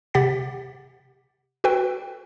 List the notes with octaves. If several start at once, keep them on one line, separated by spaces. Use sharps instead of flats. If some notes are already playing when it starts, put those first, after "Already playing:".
C3 G4 F#5 A6 B6
F#4 A4 B4 G5